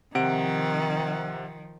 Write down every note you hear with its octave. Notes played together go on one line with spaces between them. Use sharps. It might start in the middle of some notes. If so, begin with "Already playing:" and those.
C3 D#3 F3 F#5 D7